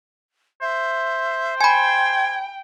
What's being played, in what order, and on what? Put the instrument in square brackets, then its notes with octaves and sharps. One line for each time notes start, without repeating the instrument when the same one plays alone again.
[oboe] C5 [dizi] E5
[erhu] G5 [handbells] G#5 B5 [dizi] G#6